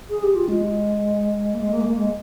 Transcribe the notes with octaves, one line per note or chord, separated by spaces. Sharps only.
G#4
G4
F4
G#3
A#3
G#3
A#3
G#3
A#3
G#3